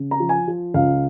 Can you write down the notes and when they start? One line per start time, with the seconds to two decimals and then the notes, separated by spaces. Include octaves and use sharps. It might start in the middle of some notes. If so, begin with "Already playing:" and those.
Already playing: C#3
0.11 A#5
0.20 F3
0.29 G#5
0.48 F3
0.74 C#2 F5